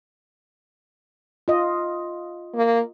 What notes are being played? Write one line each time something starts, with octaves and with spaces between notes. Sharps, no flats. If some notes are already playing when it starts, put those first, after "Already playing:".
F4 D#5
A#3